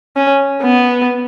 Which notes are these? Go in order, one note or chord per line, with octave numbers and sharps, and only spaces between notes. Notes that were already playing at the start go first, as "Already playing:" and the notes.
C#4
B3